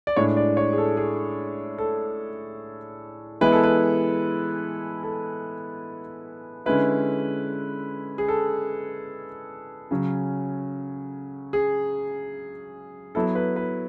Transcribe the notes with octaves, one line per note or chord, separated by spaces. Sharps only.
D5
A2 G#3 D4 C#5
D5
C#5
G#4
A4
G#4
A4
E3 G#3 B3 E4 B4
A4
B4
A4
D3 G#3 C#4 E4 B4
G#4
A4
C#3 F#3 C#4
G#4
F#3 B3 E4 A4
B4
B4